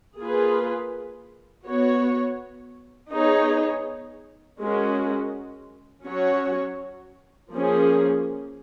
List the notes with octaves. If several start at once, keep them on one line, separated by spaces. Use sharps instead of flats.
A#3 F4 G#4 B4
B3 F#4 C#5
B3 D#4 G#4 C#5
G#3 C#4 F#4 A#4
F#3 C#4 F#4 C#5
F3 A#3 C#4 G#4